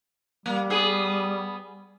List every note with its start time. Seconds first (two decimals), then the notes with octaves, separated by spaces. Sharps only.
0.46 G3 A#3
0.70 B3 G#4